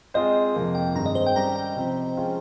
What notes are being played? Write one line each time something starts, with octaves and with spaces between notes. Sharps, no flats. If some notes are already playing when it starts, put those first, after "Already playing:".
G#3 C4 F4 G#4 C5 D#5
F2 C3 F3 A#3
G5
G2 D#3 G#3 C4 A#5
D#5
C5
G5
G3 C#4 G4 A#5
G5
C3 F3 C4
F3 G#3 C#4 F4 G#4